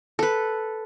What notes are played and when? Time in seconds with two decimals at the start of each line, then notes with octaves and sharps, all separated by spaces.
0.19 A4 B4